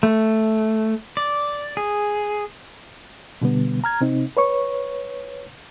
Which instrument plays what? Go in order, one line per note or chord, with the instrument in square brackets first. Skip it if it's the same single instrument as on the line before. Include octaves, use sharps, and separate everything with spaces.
[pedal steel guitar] A3
D5
G#4
[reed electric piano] B2 D3 G3 B3
A#5 F6 G#6
C3 C4 D#4
B4 C#5 C#6